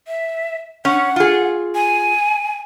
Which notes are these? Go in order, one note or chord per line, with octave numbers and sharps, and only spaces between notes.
E5
C#4 F#5
F4 G#4
G#5